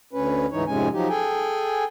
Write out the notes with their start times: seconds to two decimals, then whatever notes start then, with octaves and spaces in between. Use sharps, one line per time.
0.13 D2 C#4 B4
0.52 D2 G#2 E3 D#4 C#5
0.67 F2 G#2 C3 G#3 C#4 G#5
0.93 F3 F#3 D#4 G4
1.09 G#4 A4 G5 G#5